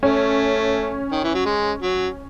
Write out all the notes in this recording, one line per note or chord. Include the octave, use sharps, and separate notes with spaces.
A3 C#4
D#3
E3
F#3
G#3
F#3